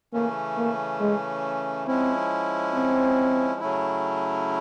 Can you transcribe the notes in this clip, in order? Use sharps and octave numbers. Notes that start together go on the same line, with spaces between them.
C#3 E3 A3 A#3 C#4
A#3
G#3
F3 G#3 C4 C#4 E4
C4
C#3 F#3 A3 C#4 E4